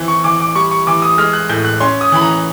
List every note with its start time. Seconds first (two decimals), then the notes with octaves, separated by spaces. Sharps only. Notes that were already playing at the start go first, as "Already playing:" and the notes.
Already playing: E3 C4
0.08 C#6
0.24 E3 D6
0.40 D6
0.55 G3 C#6
0.71 C#6
0.87 E3 D6
1.02 D#6
1.18 G#3 F6
1.33 F#6
1.49 A2 G6
1.65 F#6
1.80 C#4 C6
2.01 D#6
2.12 E3 B5
2.22 A#5